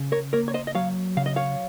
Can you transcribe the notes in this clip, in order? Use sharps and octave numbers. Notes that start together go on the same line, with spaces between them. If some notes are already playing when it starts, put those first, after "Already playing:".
Already playing: C#3
A#4 C#5
A#3 A#4 C#5
C#5
C5 D#5
D#5
F#3 C#5 F5
C#3 F5
D#5
C#5 F5